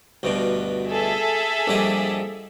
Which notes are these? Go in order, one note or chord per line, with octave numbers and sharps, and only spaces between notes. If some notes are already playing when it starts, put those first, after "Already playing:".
D2 G2 B2
G#4 A4 E5
A#1 G3 D#5